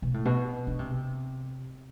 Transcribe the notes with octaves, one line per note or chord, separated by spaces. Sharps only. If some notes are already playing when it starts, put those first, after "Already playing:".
B2
A2
B2
D3
C3